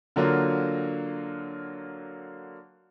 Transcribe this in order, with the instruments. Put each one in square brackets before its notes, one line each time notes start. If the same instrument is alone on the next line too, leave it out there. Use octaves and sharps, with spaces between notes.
[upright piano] D3 F#3 A#3 F4